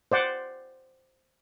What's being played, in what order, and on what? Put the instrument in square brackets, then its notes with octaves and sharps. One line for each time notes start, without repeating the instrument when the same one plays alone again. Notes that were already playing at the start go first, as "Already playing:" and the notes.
[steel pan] C5 D5 F#5